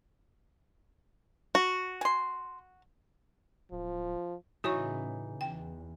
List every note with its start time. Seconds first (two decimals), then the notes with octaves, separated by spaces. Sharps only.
1.55 F#4
2.01 G#5 C6
3.71 D1 F3
4.64 A2 C#3 E3 D#4 F#4 C#5 C#6
5.41 E2 G5